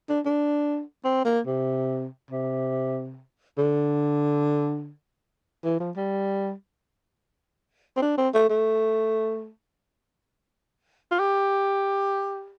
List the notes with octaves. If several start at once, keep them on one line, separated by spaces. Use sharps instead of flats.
D4
D4
C4
A#3
C3
C3
D3
E3
F3
G3
C4
D4
C4
A3
A3
F4
G4